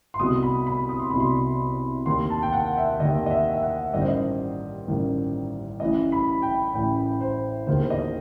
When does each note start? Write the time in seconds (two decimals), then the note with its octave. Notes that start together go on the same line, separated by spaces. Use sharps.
0.14 C6
0.20 C2 B2 D#6
0.43 B5
0.67 B5
0.89 D#6
1.00 C6
1.10 C2 B2 B5
1.20 C6
2.06 D#2 D#3 C6
2.30 A5
2.43 G5
2.53 F#5
2.77 E5
3.00 D#2 D#3 D#5
3.26 D#5
3.30 E5
3.54 E5
3.63 F#5
3.94 A1 G2 D#3 D#5
4.01 C5
4.08 D#5
4.87 A1 G2 D#3
5.80 A1 A2 E3 D#5
6.12 B5
6.42 G5
6.74 A1 A2 E3 G5
7.21 C5
7.67 E1 D#2 D#3 C5
7.90 D#5